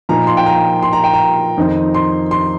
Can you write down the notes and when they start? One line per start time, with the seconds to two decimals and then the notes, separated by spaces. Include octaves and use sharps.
0.09 A#2 F3 A#3 D#4 A#5
0.27 C6
0.37 G5
0.46 A#5
0.83 C6
0.93 A#5
1.04 G5
1.14 A#5
1.57 F2 D#3 C4 D#4
1.94 C6
2.31 C6